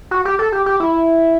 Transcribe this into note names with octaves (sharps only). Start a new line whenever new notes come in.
F#4
G4
A4
G4
G4
E4